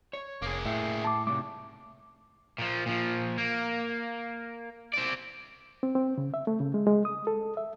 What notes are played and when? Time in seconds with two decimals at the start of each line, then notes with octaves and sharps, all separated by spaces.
0.13 C#5
0.42 F1 A#3 G#4
0.66 A2 E5 G5
1.05 A5 D6
1.27 C3 A3 D6
2.59 A#2 F3
2.86 A#2 F3
3.38 A#3
4.94 C4 D5
5.83 C4
5.95 C4
6.18 C#3
6.34 E5
6.47 A3
6.60 C#3
6.74 G#3
6.87 G#3
7.05 D#6
7.27 A4
7.57 E5